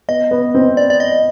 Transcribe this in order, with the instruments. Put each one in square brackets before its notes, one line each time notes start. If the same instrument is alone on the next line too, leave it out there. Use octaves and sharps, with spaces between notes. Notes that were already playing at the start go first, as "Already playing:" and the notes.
[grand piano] B3 [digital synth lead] D#5
[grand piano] B3
C4
[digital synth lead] D5
D5
D#5